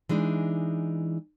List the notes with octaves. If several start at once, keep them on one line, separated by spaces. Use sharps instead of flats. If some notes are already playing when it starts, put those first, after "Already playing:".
E3 G#3 D4 D#4